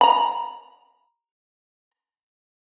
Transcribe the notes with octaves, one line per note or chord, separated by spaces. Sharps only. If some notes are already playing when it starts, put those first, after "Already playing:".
A#5 B5